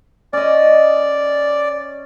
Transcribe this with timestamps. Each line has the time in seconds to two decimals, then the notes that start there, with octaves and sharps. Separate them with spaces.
0.33 C#4 D5 D#5